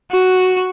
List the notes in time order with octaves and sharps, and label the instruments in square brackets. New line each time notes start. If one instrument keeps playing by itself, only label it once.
[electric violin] F#4